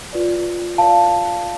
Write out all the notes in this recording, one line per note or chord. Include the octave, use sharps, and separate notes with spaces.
F4 B4 D5
F4 B4 D5 F5 A5